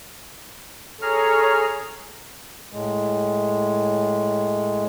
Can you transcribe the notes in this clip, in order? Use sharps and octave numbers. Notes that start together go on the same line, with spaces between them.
G#4 A4 C#5 A#5 F6
A2 G#3